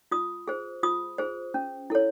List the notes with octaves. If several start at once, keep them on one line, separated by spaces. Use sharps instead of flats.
F4 D#6
G#4 C5
F4 D#6
G#4 C5
C#4
E4 A4 C#5